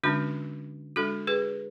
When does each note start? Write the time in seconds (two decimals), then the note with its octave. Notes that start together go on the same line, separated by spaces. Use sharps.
0.03 D3 G#3 C#4 D4 F#4
0.96 G#3 D4 F#4 A4
1.27 G#4 B4